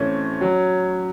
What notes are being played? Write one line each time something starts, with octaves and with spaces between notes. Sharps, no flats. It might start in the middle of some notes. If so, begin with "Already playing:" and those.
Already playing: A2 E3 A3 C4 C#4
F#3